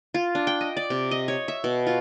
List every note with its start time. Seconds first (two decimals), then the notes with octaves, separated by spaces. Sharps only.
0.14 F4
0.35 D4
0.47 G5
0.61 D#5
0.77 D5
0.90 C3
1.11 D#5
1.28 C#5
1.48 E5
1.64 B2
1.87 F4